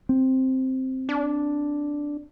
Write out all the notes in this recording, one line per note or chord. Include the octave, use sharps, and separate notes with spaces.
C4
D4